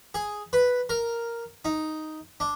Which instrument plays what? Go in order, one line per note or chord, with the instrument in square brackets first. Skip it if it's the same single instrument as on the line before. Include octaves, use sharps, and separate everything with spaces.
[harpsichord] G#4
B4
A#4
D#4
D4